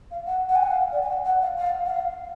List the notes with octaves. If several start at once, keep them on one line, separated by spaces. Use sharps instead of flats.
F5
F#5
F#5
G#5
F#5
F5
D5
G#5
F#5
F#5
F5
F5
F#5
F5